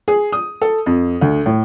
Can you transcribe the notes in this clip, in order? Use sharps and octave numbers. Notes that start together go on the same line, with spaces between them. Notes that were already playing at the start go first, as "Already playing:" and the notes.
G#4
D#6
A4
F2
D2
A2